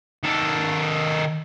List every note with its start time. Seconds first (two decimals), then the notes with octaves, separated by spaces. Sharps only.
0.23 D#3 A4